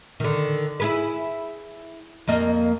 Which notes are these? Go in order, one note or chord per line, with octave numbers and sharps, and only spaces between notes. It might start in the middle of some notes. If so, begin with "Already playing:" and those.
D3 D#3
E4 G#4 B4
F2 A#3 D#5